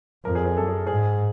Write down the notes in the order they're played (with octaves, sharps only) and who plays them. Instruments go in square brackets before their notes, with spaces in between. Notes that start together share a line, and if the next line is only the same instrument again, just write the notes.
[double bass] F2 [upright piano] A#4
[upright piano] G#4
G#4
[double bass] F#2 [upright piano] A4
[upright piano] G#4
[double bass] G#2 [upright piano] G#4